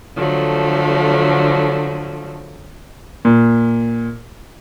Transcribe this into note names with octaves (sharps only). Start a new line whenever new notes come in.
D3 F3 F#3 A3
A#2